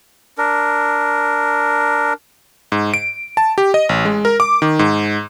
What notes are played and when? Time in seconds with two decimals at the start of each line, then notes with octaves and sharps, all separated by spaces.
0.38 D4 A#4
2.72 G#2
2.94 D7
3.37 A5
3.58 G4
3.74 D#5
3.89 A1
4.05 G#3
4.25 A#4
4.40 D6
4.62 D#3
4.79 G#2